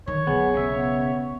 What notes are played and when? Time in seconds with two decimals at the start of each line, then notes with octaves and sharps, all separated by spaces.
0.07 D3 D#3 C#5
0.27 B1 B3 G#4
0.54 C#3 E5
0.72 B3